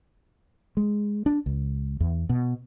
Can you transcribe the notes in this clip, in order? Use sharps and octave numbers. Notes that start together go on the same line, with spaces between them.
G#3
D4
C#2
E2
B2